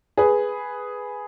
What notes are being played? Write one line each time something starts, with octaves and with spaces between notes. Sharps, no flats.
G#4 B4